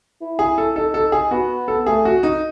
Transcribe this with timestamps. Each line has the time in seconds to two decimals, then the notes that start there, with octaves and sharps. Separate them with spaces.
0.21 E4
0.39 G#4
0.58 A4
0.76 D#4 A4
0.94 A4
1.12 G#4
1.31 B3 F#4
1.68 A4
1.87 A3 G#4
2.05 F#4
2.23 D#4